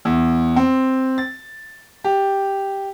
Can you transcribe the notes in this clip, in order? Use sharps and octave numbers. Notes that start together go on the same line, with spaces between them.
E2
C4
A6
G4